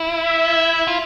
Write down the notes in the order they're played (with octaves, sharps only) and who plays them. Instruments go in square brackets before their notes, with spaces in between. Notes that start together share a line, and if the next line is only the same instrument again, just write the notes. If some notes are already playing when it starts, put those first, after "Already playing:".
Already playing: [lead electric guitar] E4
[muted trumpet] E5
[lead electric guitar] F4